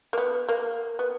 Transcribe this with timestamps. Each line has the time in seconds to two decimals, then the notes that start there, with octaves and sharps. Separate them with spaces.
0.13 A#3
0.18 B3
0.49 A#3
0.99 B3